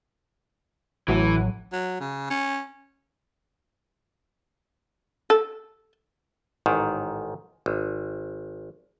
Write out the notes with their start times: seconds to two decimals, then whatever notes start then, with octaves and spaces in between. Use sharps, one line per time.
1.08 A1 A2 E3 F#3
1.73 F#3
2.00 C#3
2.30 C#4
5.30 A4
6.66 A1 G#2 D#3
7.66 G#1